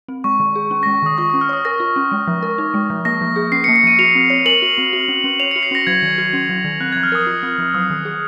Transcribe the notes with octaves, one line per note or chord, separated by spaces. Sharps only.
C4
G#3 C#6
D#3
G#4
C#4
G#3 A#6
D#3 D#6
F4 C#6
C#4 D#6
F6
C#5 D#6
A#4 A#6
F4
C#4
G#3
F3
A#4
D#4
G#3
F3
A#3 A#6
F3
G#4
C#4 C7
C#7
A#3
C#7
F3 D#7
F#4 F7
C4
C#5
A#4 F#7
F#4
C4
F#4
C#4
C#4
C#5 F7
F#4 C#7
C7
C#4 A#6
F#3 G#6
D#3
F#4
C#4
F#3
D#3
C4 F#6
F3 G#6
F6
A#4 D#6
F4
C4
F3
F#3 D#6
D#3
G#4